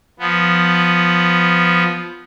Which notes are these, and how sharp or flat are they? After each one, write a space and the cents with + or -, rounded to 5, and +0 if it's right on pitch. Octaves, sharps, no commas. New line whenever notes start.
F3 +0 B3 +0